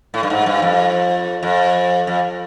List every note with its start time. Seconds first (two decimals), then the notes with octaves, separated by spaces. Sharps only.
0.14 A2
0.23 G2
0.30 G#2
0.46 G2
0.62 F2
1.43 F2
2.07 F2